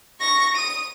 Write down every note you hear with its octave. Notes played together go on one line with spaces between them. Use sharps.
C#6 A#6
D#6 D#7